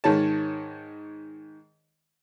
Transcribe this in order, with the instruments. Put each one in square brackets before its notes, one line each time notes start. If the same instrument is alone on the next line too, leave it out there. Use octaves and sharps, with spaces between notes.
[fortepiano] G#2 D#3 C#5 A5